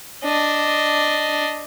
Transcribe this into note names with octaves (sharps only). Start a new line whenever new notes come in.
D4 D#5